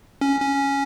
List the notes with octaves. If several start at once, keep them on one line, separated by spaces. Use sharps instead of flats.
C#4
C#4